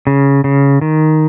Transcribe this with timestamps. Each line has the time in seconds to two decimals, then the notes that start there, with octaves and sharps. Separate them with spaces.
0.07 C#3
0.44 C#3
0.81 D#3